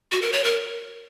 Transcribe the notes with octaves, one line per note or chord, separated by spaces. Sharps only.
F#4
A#4
C#5
A#4